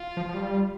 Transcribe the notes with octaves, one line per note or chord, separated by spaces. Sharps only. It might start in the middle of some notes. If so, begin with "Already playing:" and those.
Already playing: F4
F3
F3
G3